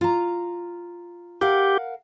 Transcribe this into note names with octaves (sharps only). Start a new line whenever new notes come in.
F4 A#5
G4 A#4 F5 F#5